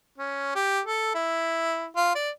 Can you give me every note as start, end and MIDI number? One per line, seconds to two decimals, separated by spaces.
0.18 0.51 61
0.55 0.81 67
0.86 1.11 69
1.15 1.89 64
1.96 2.14 65
2.15 2.30 74